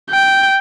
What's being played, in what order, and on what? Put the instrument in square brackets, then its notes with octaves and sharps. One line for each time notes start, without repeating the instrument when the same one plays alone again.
[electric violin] G5